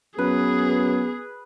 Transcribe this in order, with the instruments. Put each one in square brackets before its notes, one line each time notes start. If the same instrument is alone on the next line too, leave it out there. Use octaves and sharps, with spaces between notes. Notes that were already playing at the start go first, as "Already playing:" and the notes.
[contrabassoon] F#2 [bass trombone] B3 [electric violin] G#4 [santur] B4